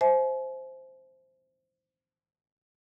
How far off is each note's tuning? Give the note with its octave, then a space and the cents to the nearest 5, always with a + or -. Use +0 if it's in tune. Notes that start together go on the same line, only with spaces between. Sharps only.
C5 +0 E5 -15 G#5 +45